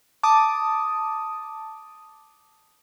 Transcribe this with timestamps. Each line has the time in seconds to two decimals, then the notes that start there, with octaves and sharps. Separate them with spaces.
0.23 A5 D6 D#6